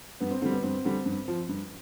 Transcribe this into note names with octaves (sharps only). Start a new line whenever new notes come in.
G2 B3
C4
D3 G3 C4
B3
G2 C4
D3 G3
G2
F3
G2